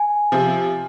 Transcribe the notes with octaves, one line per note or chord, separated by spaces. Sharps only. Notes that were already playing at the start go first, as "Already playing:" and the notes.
Already playing: G#5
C3 F3